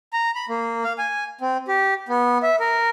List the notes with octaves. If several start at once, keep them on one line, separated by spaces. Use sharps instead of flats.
A#5
B5
A#3
F5
G#5
C4
G4
B3
E5
A#4